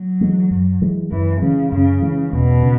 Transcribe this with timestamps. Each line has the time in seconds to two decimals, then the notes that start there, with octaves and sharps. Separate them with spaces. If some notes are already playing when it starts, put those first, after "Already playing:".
Already playing: F#3
0.21 E3 G#3
0.51 F#2
0.82 E3 G#3
1.11 F#2 E3
1.41 C#3 E3 G#3
1.72 F#2 C#3
2.02 E3 G#3
2.33 E2 B2
2.63 C#3